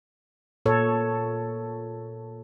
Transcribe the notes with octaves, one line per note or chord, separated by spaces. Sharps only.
A#2 A4 C#5